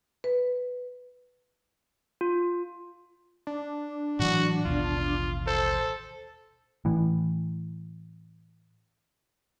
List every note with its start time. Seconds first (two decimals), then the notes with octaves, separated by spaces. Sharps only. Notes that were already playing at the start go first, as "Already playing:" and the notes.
0.24 B4
2.21 F4
3.47 D4
4.19 A2 E3 F#3 F#4
4.65 A1 D#2 B2 F4
5.47 A4 C5
6.85 A2 E3